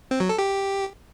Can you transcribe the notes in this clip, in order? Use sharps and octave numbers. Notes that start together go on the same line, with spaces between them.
C4
F#3
A4
G4